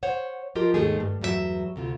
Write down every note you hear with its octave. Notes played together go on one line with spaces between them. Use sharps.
C5 C#5 F#5
F3 F4 G4 A#4 D#5
D#2 G#2 D#3 A3 G4 G#4
G2
E2 G2 F#3 G4 E5
D2 C3 F4